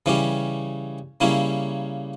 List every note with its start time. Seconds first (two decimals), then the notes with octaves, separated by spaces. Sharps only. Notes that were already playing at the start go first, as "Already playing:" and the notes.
0.06 C#3 E3 G3 C#4 G4
1.21 C#3 G3 A#3 C#4 E4